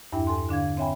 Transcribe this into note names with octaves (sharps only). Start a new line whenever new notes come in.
E2 G2 D4 E4 E5 G5
A4 G#5 C6
D3 D4 F5 G#6
C4 C#5 E5 G5 G#5 B5